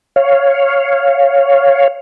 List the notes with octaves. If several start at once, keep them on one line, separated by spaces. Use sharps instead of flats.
C#5 F5